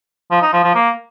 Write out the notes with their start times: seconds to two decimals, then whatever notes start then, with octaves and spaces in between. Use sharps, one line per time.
0.31 F3
0.42 D#4
0.53 F3
0.64 F3
0.75 A#3